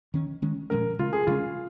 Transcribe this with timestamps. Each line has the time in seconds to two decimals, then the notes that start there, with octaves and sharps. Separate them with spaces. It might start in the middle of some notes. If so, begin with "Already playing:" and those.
0.14 D#3 C#4
0.42 D#3 G#3 C#4
0.70 A#2 F3 G#3 C#4 A#4
0.99 C#3 G#3 C#4 F4
1.13 G#4
1.27 C#3 G#3 C#4 F4